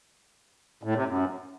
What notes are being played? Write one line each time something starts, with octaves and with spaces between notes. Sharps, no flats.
A2
C3
F#2